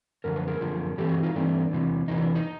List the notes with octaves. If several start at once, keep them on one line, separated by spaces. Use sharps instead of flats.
F#2 D3 F3 A#4
B4
G#4 A#4
F#2 D3 F3
G2 E3 A3 C4 G4 A4
F#4 G#4
D#4 F4
G2 E3 A3 C4 D4
E2 C3 E3
E2 C3 E3 D#4
D4
D#4